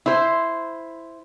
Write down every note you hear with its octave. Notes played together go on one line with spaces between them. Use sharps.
E4 C5